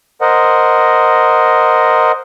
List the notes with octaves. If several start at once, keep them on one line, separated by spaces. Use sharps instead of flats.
A#4 C5 D#5 F#5